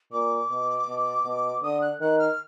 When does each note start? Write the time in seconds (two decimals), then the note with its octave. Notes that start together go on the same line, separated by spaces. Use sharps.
0.12 A#2 D6
0.50 B2
0.87 B2
1.25 B2
1.62 D3 D#6
1.81 F#6
2.00 D#3 F#6
2.19 F6